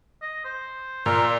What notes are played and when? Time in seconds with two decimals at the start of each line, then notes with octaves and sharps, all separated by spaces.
0.22 D#5
0.45 C5
1.06 A#2 A#4 D5 E6